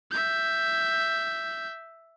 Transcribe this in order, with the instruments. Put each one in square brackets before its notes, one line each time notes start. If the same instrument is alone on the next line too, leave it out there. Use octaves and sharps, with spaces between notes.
[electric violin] E5 G6